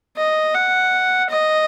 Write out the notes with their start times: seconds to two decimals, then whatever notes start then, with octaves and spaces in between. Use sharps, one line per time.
0.17 D#5
0.54 F#5
1.30 D#5